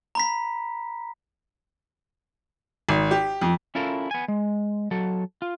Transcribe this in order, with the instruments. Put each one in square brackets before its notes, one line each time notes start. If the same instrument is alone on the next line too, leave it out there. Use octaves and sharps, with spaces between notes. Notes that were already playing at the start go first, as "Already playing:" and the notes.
[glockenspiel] A#5 B5 B6
[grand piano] G#1
G4
F2
[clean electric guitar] C#4 E4 F4 A4 A#4
B3 G#5
G#3
F#3 A4
F4